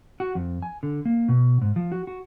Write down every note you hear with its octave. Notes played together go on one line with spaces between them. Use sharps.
F#4
F2
G#5
D3
A#3
B2
G#2
F3
F#4
F#4